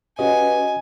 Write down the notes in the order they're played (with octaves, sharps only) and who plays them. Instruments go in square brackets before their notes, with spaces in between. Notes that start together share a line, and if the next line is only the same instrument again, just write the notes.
[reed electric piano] C#4 F#4 D#5 [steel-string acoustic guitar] G4 B4 F#5 [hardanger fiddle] G#5